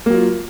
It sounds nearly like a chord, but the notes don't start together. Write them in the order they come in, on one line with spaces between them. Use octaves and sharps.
A#3 F#3 F4